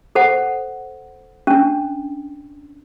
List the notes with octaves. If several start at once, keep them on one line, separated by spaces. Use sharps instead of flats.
A4 C5 F#5
C#4 D4